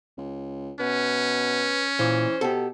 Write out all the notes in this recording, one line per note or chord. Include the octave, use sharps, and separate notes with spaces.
C#2
B2 C#4 B4
A#2 E3 C5
B2 G4 A4